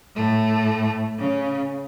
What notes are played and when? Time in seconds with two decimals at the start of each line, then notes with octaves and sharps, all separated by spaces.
0.16 A2 A3
1.18 C#3 C#4